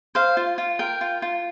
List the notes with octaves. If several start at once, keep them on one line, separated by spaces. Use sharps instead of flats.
C5 F5
F4
F4
A#4 G5
F4
F4